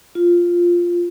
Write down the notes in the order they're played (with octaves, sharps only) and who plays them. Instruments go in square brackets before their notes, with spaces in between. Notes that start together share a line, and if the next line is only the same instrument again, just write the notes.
[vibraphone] F4